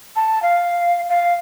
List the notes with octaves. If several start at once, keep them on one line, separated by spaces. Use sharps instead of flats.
A5
F5
F5